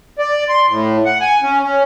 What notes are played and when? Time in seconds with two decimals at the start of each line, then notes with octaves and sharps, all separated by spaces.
0.19 D5
0.49 C6
0.69 A2
1.06 F#5
1.21 G#5
1.43 C#4
1.62 C#4